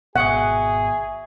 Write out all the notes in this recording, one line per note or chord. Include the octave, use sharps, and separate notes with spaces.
G#1 B2 G#4 E5 F#5 C#6 D#6